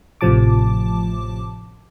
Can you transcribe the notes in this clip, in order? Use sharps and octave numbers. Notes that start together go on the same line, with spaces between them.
A1 A2 C3 F3 A5 D6